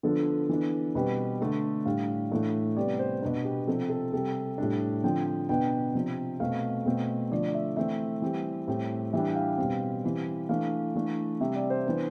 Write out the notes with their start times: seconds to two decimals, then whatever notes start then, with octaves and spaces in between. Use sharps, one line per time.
0.03 D3 F3 B3 D4 A4
0.49 E3 B3 D4
0.95 B2 G3 C4 B4
1.41 D3 A3 D4
1.85 A2 G3 D4 F5
2.32 A2 E3 A3 D4
2.77 C3 G3 B3 D5
2.99 C5
3.22 B2 B3 D4 B4
3.45 G4
3.67 C3 F3 C4 A4
3.90 A4
4.12 C3 G3 C4 A4
4.58 A2 G3 D4
5.04 D3 F3 C4 G5
5.26 G5
5.49 B2 B3 D4 G5
5.95 C3 F3 C4
6.40 B2 A3 C4 F5
6.86 B2 A3 C4
7.31 D3 F3 A3 D5
7.48 D5
7.54 E5
7.77 E3 A3 C4 E5
8.22 E3 G3 C4
8.68 A2 G3 C4
9.13 E3 G3 D4 E5
9.28 G5
9.35 F5
9.58 B2 G3 C4
10.04 E3 G3 C4
10.49 E3 A3 D4 F5
10.95 E3 A3 D4
11.40 C3 G3 C4 E5
11.56 D5
11.70 C5
11.85 E3 B3 D4